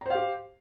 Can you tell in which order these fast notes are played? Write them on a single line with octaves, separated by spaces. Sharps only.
A#5 C5 F5 G4